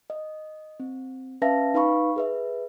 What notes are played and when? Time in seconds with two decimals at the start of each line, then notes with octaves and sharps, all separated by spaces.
0.10 D#5
0.80 C4
1.42 C#4 B4 E5 F5 A5 A#6
1.74 D#4 B4 F5 B5 C#6
2.16 G#4 B4 E5